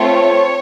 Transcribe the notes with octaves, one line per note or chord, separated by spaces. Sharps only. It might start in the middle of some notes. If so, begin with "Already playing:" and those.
Already playing: A3 C4 F4 A4 C#5